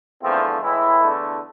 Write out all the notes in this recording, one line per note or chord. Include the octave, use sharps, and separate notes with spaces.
E2 D3 F3 A3 C4
A2 E3 G#3 E4
E2 D3 A3